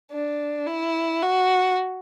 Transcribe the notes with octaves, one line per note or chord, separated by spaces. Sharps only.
D4
E4
F#4